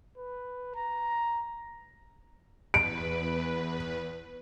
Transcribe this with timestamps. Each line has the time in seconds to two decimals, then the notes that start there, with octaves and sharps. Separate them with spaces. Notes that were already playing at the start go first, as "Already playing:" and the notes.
0.17 B4
0.75 A#5
2.74 E2 B4 D7